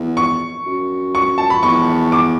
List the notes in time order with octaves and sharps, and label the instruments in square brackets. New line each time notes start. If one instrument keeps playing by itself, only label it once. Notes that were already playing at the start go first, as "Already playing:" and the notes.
Already playing: [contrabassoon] E2
[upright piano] C#6
[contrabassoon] F#2
[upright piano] C#6
A5
B5
[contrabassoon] E2 [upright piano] C#6
[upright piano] D6